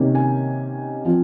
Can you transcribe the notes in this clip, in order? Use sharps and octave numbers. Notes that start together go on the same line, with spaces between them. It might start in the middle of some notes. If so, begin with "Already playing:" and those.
Already playing: C3 D#3 A#3 C#4
G#5
F3 C4 F4